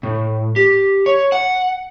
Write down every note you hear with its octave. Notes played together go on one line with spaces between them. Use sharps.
A2
G4
C#5
F#5